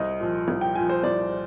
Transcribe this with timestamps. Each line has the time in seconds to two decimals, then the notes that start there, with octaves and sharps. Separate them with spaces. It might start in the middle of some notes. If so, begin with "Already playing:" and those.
Already playing: C2 D#5
0.20 A#2 F3
0.48 C2
0.61 G5
0.75 A#2 F3 G#5
0.89 C5
1.04 C2 D5